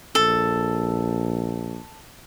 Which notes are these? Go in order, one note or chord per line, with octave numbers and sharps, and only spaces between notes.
A#1 A4